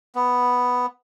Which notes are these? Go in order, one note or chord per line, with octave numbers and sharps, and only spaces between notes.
B3